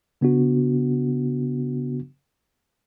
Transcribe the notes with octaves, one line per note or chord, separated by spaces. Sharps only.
C#3 B3 D4 F#4